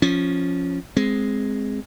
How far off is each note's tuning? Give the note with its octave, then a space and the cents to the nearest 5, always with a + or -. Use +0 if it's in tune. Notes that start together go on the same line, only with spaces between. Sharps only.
F3 +0 C#4 +0
G#3 +0 C4 -5